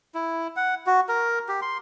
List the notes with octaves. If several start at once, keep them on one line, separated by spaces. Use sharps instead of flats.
E4
F#5
F#4
A#4
G4
C6